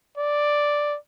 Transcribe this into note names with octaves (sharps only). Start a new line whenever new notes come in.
D5